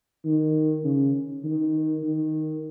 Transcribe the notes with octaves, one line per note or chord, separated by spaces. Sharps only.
D#3
C#3
D#3
D#3